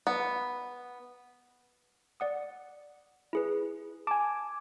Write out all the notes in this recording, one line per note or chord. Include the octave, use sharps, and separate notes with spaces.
B3
D5 F#5 D#6
E4 G#4 B4
G#5 A5 D6